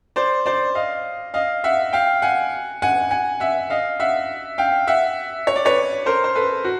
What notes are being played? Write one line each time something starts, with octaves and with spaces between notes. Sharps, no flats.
C5 D5
C5 D5
D#5 F5
D#5 F5
E5 F#5
F5 G5
F#5 G#5
F#5 G#5
F#5 G#5
E5 F#5
D#5 F5
E5 F#5
F5 G5
E5 F#5
C#5
D5
B4 C#5
A#4 C5
C5
A4 B4
F#4